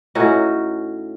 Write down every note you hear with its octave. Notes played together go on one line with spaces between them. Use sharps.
A2 C#4 D#4 F#4